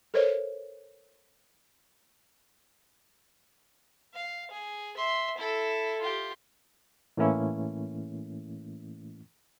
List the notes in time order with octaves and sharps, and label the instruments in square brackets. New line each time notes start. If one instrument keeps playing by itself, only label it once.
[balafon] A4 A#4 C5 C#5 D#5
[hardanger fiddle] F5
G#4
E5 C6
E4 A4
F4 G4
[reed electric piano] A2 E3 A3 A#3 C#4 E4